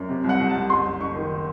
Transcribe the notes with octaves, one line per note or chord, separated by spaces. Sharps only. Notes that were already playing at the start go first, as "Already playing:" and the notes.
Already playing: F#2
C3
C2
F#5
C2
A5
C2
F#1 C6
F#1
F#1 C#6
D#3